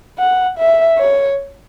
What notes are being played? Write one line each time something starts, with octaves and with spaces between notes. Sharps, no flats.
F#5
E5
C#5